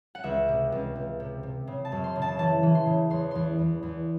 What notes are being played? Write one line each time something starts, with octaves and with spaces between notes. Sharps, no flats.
F#5
C#2 E5
C3
C#2
C#2
C3
C3
C#3
A5
F#2
C6
C#3
A5
E3 A5
E3
C6
C#3
E2 C6
E2 C6
E2
E2